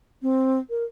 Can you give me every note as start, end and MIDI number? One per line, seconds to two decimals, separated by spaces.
0.22 0.59 60
0.70 0.84 70